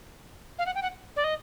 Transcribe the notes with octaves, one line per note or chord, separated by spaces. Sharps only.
F5
F#5
G5
F#5
D5
D#5